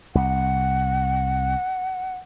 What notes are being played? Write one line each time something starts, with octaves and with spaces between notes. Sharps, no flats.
C2 F#5